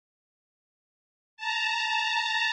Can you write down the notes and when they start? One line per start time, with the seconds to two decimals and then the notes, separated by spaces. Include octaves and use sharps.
1.37 A5 A#5